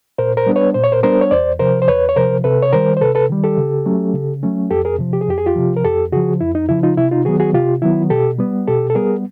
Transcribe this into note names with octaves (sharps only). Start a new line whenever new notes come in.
A#2 A#4 C5
A#4 C5
G3 B3 D4
B4 C#5
A#2 C5
C#5
A#4 C5
G3 B3 D4 A#4 C5
C#5
E2 C5 D5
C3 F3 A#4 C5
C5
E2 B4 C#5
C#5
C3 F3 A#4 C5
C3 A4 B4
C#5
D#3 G3 A#4 C5
C5
C3 A4 B4
A4 B4
D#3 G3
G4 A4
C#3
F#3 A3 C#4
C#3
F#3 A3 C#4
F2 G4 A4
G#4 A#4
C3 F3
G4
G#4
F2 G4
G#4
F4 G4
C3 F3
A#4
F2 G4 A4
C#3 F3 F#4 G#4
F2 E4
D#4
C#3 F3 E4
D#4 F4
C3 E4
D#4 F4
D#3 F#3 B3 F#4 G#4
F#4 G#4
C3 F4 G4
D#3 F#3 B3 E4
B2 G4 A4
G3 B3
B2 G4 A4
A4
G3 B3 G#4 A#4